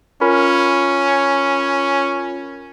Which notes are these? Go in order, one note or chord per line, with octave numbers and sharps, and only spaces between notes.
C#4 F4 A#4 B5